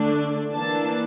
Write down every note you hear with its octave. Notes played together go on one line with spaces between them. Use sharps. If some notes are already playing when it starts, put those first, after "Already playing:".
Already playing: D3 A3 D4
E3 A#3 D4 A5